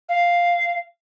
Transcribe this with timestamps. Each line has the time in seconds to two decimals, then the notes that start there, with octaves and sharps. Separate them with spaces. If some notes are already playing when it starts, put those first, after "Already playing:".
0.08 F5